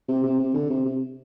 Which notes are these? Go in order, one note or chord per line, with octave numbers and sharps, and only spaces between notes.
C3
C3
C3
D3
C3
C3